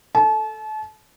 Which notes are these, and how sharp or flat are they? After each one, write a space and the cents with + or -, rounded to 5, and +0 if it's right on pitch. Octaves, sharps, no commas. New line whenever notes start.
A4 +0 A5 -35